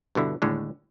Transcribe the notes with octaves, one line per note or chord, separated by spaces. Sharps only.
G2 B2 D3 E4
D#2 A2 D3 G#3